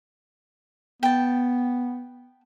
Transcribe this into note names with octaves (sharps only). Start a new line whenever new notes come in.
B3 G5 A5